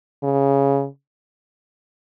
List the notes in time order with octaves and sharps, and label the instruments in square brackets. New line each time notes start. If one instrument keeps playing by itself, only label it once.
[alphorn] C#3